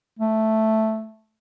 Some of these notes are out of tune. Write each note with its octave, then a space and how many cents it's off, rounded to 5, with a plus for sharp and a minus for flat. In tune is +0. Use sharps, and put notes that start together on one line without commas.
A3 +0